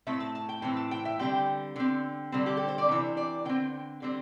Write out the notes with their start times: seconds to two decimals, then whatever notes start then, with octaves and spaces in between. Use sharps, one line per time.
0.07 A2 A3 C4 E5
0.20 A5
0.35 A5
0.49 G5
0.62 A2 E3 C4
0.76 A5
0.91 G5
1.05 E5
1.19 D3 G3 C4 G5
1.76 D3 C4
2.32 D3 G3 C4
2.46 G4
2.57 A4
2.68 C5
2.78 D5
2.89 C3 E3 C4
3.17 D5
3.45 D3 C4 G5
4.02 D3 G3 C4